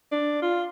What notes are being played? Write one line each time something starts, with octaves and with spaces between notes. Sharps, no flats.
D4
F4